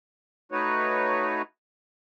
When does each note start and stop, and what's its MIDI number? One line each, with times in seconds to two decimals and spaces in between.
0.52 1.42 57
0.52 1.42 63
0.52 1.42 66
0.52 1.42 71
0.52 1.42 73